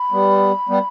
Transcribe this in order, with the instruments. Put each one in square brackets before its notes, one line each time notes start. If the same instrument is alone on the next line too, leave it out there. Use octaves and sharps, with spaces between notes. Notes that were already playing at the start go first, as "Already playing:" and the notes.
Already playing: [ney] B5
[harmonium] G3 B3
G3 B3